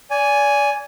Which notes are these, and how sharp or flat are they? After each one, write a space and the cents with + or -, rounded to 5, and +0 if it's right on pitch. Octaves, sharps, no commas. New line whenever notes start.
D5 -30 G#5 +0